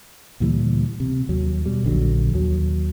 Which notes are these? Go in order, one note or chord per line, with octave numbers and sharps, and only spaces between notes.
D2 A#2 E3 G3
C3
D#2 F#3
B2 G3
A#1 D3 F3 F#3
D#2 F#3